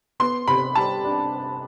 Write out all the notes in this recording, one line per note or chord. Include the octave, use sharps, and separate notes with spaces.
B3 C6
C3 B5
G3 A5
D4